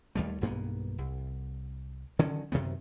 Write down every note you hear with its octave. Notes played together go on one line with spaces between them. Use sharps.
D#2 G3 A3
B1 G2 A#3 B3
C2
D3 D#3 F#3 C#4
F#2 C3 D#3 B3